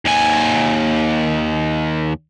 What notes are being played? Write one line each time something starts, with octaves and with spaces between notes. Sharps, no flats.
D#2 G#5